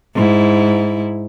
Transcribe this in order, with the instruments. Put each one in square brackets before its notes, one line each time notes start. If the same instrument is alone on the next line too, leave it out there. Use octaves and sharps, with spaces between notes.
[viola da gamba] G#2 E4